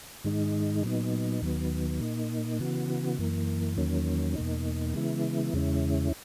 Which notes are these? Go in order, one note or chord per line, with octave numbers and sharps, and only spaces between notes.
G#2 D#3 G#3 D#4
A#2 F#3 B3 D#4
D#2 D#3 F#3 B3
A#2 A#3 D#4
C#3 E3 B3 F#4
F#2 E3 A#3
E2 D#3 F#3 A#3 C#4
E2 B2 A#3 D#4
C#3 E3 G#3 B3 E4
E2 C#3 G#3 C#4 E4